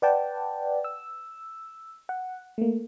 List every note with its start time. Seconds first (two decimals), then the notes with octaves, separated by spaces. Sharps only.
0.02 B4 D5 F#5 G5 A5
0.84 E6
2.09 F#5
2.58 A3 A#3